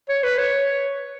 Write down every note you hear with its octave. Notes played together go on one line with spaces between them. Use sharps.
C#5
B4
C#5